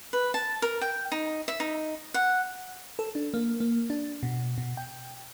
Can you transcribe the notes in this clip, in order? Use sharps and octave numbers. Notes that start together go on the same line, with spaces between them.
B4
A5
A#4
G5
D#4
E5
D#4
F#5
A4
D4
A#3
A#3
D4
B2
B2
G5